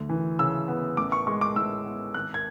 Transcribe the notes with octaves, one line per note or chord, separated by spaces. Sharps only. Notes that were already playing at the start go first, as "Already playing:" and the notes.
Already playing: D2
E3
C#3 E6
B3
A1 D6
C#6
G#3 C#6
D6
A2 E6
B3
G#1 F#6
G#6